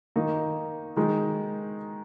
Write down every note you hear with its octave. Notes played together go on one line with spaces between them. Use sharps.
D#3 A#3 D#4
D#3 G#3 D#4